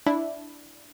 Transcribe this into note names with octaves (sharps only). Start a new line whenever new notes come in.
D4 E4